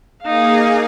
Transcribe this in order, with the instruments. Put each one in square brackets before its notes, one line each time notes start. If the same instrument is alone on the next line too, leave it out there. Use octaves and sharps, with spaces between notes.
[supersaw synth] A#3 G#4 [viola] D#4 F5